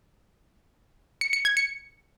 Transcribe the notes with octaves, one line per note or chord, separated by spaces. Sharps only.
C#7
C#7
G#6
C#7